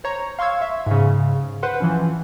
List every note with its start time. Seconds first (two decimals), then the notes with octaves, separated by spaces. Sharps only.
0.04 C5 C#5 A#5
0.39 F5 C6 C#6 E6 G#6
0.62 E5
0.86 G#2 C#3
1.63 B4 C5 F#5 C6
1.80 E3 F3 C#4